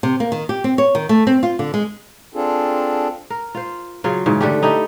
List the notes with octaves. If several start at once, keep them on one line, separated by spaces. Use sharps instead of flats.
C3
A#3
D#3
G4
C4
C#5
D#3
A3
C4
F4
D3
G#3
C4 D4 F4 G#4 A4
A#4
F4 C5
C#3 F#3 F4
G#2 C#3 E3
D3 A3 G4
D#4 E4 G4 A4